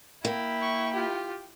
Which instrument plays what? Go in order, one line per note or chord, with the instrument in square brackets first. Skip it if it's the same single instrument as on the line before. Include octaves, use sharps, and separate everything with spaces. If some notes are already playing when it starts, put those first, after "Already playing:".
[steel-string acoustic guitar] A#3 [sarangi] E4 [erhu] G5
[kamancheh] C#6
F4 G4